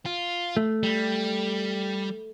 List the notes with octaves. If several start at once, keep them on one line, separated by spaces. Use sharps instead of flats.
F4
A3
G3